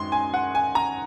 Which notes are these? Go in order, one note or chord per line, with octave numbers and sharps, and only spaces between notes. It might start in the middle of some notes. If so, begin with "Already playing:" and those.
Already playing: F#2 D#3 G#3 C6
G#5
F#5
G#5
A#5